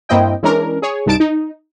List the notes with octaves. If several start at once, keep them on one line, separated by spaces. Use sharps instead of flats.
G2 A#3 C4 E4 D#5 G5
E3 G#3 C#4 D4 A#4
G#4 C#5
C2 G2 D#4 A5 D7
D#4